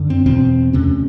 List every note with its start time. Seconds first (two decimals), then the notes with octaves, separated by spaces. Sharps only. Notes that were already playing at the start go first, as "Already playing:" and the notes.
Already playing: F#2 D3
0.10 C4
0.26 E2 B2 C4
0.73 D2 C3 C#4